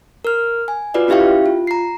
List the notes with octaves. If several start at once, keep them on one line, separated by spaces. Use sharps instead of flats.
A#4 F6
G#5
F4 F#4 B4 D5 D#5
C#4 E4 G4 E5 F5 G5
F4
A#5 C7